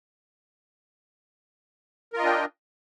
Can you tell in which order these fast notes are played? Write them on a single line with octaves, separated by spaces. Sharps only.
A#4 F4 D#5 D4 G5